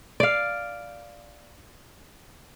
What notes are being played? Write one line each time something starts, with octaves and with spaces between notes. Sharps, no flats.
D5 F5